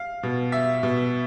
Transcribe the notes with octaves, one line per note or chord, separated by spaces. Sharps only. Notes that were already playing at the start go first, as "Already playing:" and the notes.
Already playing: F5
B2
E5
B2